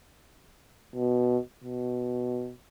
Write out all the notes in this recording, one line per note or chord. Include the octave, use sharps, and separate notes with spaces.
B2
B2